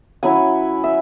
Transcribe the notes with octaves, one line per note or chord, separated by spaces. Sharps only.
F#3 C#4 E4 G#5
E5